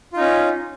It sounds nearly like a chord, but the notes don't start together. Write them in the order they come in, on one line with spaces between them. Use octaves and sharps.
F4 D#4 C#4